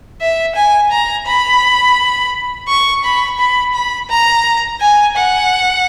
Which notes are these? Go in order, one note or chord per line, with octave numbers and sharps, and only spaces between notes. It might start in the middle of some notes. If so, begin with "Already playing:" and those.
E5
G#5
A#5
B5
C#6
B5
B5
B5
A#5
G#5
F#5